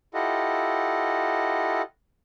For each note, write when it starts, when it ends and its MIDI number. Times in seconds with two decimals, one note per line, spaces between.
0.14 1.82 64
0.14 1.82 65
0.14 1.82 67
0.14 1.82 69
0.14 1.82 75
0.14 1.82 78